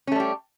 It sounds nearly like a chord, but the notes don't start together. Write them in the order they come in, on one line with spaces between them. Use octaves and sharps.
C#4 A3 G3 G4